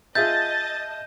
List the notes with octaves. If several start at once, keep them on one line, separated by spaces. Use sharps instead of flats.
F4 G#4 D#5 E5 A5 G6 A6